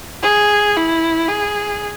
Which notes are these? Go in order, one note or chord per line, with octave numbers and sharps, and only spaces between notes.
G#4
E4
G#4